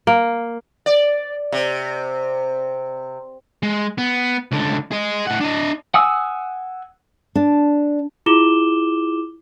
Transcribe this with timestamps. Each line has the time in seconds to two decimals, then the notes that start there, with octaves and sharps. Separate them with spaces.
0.07 A#3
0.86 D5
1.52 C3
3.63 G#3
3.98 B3
4.52 C#2 D3
4.92 G#4 D#5
5.27 A2 F#5
5.41 D4 D#5
5.94 F#5 G#5 D#6 E6
7.35 D4
8.26 E4 F4 G#4 D6 E7 G7